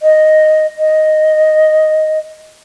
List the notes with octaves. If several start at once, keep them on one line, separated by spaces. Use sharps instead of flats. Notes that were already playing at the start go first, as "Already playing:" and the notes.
D#5
D#5